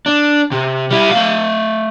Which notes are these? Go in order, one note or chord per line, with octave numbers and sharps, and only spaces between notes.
D4
C3
G3 E4
A3 F5